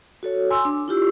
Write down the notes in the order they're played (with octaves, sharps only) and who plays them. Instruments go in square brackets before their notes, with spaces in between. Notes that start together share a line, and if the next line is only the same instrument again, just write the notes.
[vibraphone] F#4 A4 C#5
G#5 C6 E6
D4
E4 F4 G4 E6